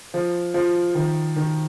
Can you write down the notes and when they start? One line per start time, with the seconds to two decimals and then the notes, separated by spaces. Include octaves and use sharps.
0.14 F3
0.54 F3
0.95 D#3
1.36 D#3